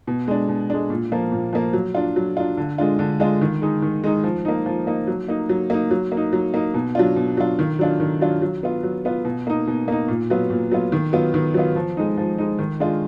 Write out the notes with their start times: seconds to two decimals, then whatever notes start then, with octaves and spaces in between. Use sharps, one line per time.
0.07 B2
0.28 G#3 D4
0.49 B2
0.70 G#3 D4
0.90 A#2
1.12 F3 A#3
1.32 A#2
1.53 F3 A#3
1.73 F#3
1.95 D4 F4
2.16 F#3
2.37 D4 F4
2.57 D3
2.78 G#3 D4 F4
2.99 D3
3.20 G#3 D4 F4
3.41 D#3
3.62 G#3 D#4
3.82 D#3
4.04 G#3 D#4
4.24 F3
4.45 A#3 D#4
4.66 F3
4.87 A#3 D#4
5.07 F#3
5.28 A#3 D#4
5.49 F#3
5.70 A#3 D#4
5.91 F#3
6.12 A#3
6.17 D#4
6.33 F#3
6.54 A#3 D#4
6.74 B2
6.95 F#3 D4 F4
7.16 B2
7.37 F#3 D4 F4
7.59 D#3
7.79 F#3 D4 F4
8.00 D#3
8.21 F#3 D4 F4
8.42 F#3
8.63 B3 F4
8.83 F#3
9.05 B3 F4
9.25 B2
9.47 A#3 D#4
9.67 B2
9.88 A#3 D#4
10.08 A#2
10.30 F#3 B3 F4
10.50 A#2
10.71 F#3 B3 F4
10.92 D#3
11.13 F#3 B3 F4
11.34 D#3
11.54 F#3 B3 F4
11.76 F3
11.97 G#3 D#4
12.18 F3
12.38 G#3 D#4
12.59 D#3
12.80 G#3 D4 F4